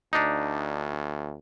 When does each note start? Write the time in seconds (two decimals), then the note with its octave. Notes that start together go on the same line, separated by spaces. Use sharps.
0.13 D2 D4 D#4